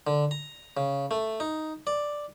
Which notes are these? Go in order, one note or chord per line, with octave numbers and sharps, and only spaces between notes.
D3
A#5
C#3
A3
D#4
D5